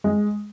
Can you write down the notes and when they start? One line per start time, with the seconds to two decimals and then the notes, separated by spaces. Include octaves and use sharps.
0.04 G#3